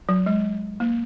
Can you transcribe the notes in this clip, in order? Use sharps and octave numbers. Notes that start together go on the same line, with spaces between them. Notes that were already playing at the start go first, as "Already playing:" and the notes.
F#3
G#3
A#3